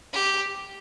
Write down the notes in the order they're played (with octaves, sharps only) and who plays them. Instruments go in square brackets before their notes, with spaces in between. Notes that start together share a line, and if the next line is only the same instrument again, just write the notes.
[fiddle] G4